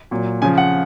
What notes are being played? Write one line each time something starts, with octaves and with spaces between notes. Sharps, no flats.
A#2 F#3
C#3 F3 G#5
F#5